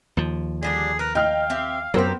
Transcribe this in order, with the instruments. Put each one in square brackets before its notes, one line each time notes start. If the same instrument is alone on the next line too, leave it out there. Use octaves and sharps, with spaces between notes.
[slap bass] D#2 F3
[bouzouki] D3 G3 D4 [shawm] G#4
[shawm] A#4 [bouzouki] B4
[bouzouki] D#4 [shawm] F5 [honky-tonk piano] G5 F6
[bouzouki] C4 G4 E5
[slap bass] F#2 F#3 [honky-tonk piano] B3 A#4 C5 [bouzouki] C4 G4